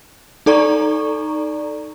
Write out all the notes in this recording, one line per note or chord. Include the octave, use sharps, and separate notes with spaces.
D#4 A4 D5 A#5 C#6